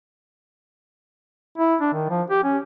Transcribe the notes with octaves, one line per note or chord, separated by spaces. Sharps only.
E4
D4
D#3
F3
G4
C#4